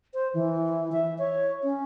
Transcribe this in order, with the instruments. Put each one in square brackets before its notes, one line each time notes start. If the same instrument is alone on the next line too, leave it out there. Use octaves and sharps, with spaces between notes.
[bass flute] C5
E3
E5
C#5
C#4